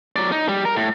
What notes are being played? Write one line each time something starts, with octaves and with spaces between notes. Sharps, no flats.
F#3 D5
D#4
G3
A#4
A2